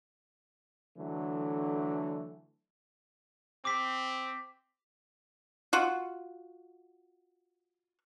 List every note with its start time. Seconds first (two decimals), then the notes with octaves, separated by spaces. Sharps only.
0.98 D3 E3 F#3 A3 D4
3.65 C4 D6 B6
5.73 F4 F#4